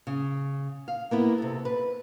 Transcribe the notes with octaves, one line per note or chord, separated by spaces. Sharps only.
C#3
F5
A#3 B3 E4
C3 A4
B4